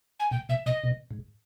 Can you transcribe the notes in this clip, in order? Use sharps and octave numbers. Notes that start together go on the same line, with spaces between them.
G#5
A#2 G5
B2 E5
B2 D#5
B2
G#2